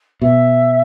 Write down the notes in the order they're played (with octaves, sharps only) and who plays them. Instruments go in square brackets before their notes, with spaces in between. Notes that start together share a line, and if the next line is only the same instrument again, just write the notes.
[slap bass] B2 [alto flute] E5